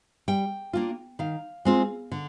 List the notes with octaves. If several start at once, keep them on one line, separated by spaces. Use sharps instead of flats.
G3 G5
A#3 D4 F4
D#3 F5
G#3 C4 F4
D3